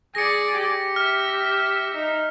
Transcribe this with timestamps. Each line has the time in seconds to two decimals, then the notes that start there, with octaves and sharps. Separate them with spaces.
0.15 G#4 D5 A#6 C#7
0.54 G4
0.96 E5 F6
1.94 D#4